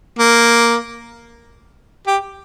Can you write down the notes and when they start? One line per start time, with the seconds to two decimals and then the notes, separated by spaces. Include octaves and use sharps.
0.19 A#3
2.07 G4